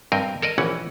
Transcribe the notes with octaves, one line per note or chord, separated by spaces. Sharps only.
G2 C4 A#4 D#5 G5
A4 A#4 D5 D#5
A#1 E3 C#4 F#5